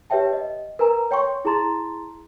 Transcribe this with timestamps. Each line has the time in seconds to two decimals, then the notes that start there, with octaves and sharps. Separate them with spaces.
0.10 G4 B4 C#5 E5 G5 A5
0.33 D#5
0.79 A#4 B4 G#5 A#5
1.11 C#5 G5 C6 C#6
1.45 E4 G#4 A5 A#5 C6 A6